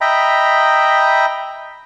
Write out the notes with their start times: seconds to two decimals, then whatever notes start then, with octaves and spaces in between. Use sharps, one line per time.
0.01 D#5 E5 G5 A#5 B5